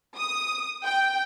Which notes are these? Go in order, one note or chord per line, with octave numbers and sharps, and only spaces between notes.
D#6
G5